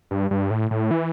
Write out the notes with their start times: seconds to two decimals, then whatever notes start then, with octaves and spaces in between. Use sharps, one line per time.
0.11 G2
0.31 G2
0.51 A2
0.71 A2
0.91 E3